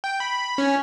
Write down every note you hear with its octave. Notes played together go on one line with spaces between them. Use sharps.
G5
B5
C#4